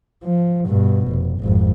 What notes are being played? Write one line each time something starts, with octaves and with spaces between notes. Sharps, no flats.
F3
G2 B2
F1
G#1 F2